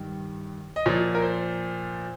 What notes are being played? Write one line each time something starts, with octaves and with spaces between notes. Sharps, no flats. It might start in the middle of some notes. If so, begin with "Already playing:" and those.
Already playing: G2 D#3
D#5
A#2 F3 C#5
A#4
C5